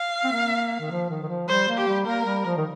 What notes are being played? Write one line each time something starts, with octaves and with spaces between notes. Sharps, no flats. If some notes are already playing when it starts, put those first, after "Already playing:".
Already playing: F5
C4
A#3
D#3
F3
D#3
D#3
F3
G3 C5
A#3
G4
G3
A#3 A#4
G3
F3
D#3